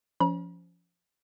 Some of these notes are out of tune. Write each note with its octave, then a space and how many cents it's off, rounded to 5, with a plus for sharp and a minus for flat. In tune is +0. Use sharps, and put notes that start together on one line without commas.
F3 -10 C#4 +25 B5 -45